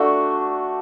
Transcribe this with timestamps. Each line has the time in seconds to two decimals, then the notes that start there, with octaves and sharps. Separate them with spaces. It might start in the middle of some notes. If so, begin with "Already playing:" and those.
Already playing: A3 D4 F#4